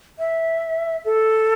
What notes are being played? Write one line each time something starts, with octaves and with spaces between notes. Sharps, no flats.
E5
A4